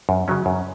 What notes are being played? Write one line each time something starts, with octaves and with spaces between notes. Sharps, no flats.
F#2
C#3 F#3 C#4
F#2